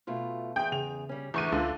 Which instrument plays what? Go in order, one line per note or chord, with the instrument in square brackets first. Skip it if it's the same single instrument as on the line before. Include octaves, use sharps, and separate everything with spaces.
[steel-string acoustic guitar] B2 A3 F4
[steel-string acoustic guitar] E2 G#4 [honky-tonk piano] G5
[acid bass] C#3 [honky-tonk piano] F7
[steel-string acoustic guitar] G3 C#4
[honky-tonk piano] E2 C#6 D#7 [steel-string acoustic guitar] D3 A3
[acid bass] C#2 [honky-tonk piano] D3 [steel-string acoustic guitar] F4